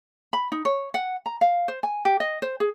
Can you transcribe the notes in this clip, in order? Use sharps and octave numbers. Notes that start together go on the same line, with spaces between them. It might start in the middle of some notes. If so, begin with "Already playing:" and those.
B5
D#4
C#5
F#5
A#5
F5
C5
G#5
G4
D#5
C5
G#4